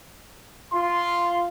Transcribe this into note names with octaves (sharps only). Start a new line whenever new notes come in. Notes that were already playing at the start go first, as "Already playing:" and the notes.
F4 C6